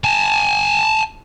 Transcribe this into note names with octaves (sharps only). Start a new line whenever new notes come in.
G#5 A5